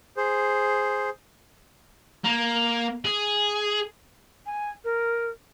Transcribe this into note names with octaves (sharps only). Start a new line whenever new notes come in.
G#4 C5
A#3
G#4
G#5
A#4